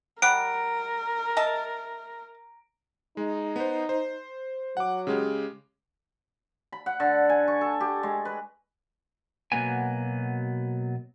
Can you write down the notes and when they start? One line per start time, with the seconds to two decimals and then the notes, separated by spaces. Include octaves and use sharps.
0.22 G3 A#4 F#5 D7
1.37 D#5 E5 A5
3.17 G#3 D#4
3.56 B3 C5
3.89 C5
4.77 F#3 F#5 D6
5.07 C#3 G#3 G4
6.72 B5
6.86 F#5
7.00 D3
7.29 G#5
7.48 C#6
7.61 A4
7.80 G4
8.03 G#3
8.25 B4
9.52 B2 F#3 A#3 B3 G#5